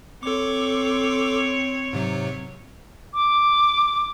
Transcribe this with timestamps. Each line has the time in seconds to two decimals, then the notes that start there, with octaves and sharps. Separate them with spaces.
0.23 C4 A4 C#5 D6
1.93 G#2 C3 F#3
3.14 D6